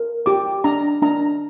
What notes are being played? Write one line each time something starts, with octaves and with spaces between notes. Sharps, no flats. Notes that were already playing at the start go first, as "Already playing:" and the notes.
Already playing: A#4
G4 D6
D4 A#5
D4 A#5